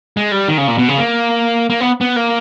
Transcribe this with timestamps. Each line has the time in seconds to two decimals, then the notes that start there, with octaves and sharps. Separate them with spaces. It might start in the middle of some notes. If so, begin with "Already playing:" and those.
0.17 G#3
0.32 G3
0.48 D#3
0.58 C#3
0.68 A#2
0.78 B2
0.88 C#3
0.98 A#3
1.70 A#3
1.80 B3
2.01 B3
2.16 A#3